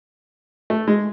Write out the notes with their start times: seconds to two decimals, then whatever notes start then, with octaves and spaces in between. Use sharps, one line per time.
0.70 A3
0.88 G#3